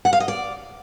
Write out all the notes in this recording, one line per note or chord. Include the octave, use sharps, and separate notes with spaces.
F#5
F5
D#5
D5